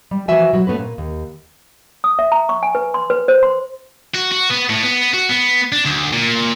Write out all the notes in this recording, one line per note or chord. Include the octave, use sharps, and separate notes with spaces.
G3
E3 F3 F#4 E5 G#5
B2 F#3 F#4
A3 B3 C#4 B4
A#2
D#2
D#6
E5
A#5
C#6
G#5
B4
C6
B4
C5
C6
F#4
F#4
B3
A2
B3
F#4
B3
D4
D2
A#2